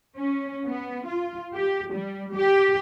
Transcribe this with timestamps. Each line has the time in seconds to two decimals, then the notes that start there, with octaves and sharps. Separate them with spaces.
0.18 C#4
0.68 B3
1.07 F4
1.55 G4
1.93 G3
2.34 G4